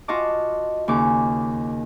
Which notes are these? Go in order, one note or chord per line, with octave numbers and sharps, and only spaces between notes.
F4 F#4 D#5 A5 D6
D#2 C#3 D6